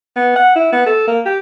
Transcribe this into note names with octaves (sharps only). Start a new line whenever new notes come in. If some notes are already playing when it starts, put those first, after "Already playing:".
B3
F#5
E4
B3
A4
A#3
G4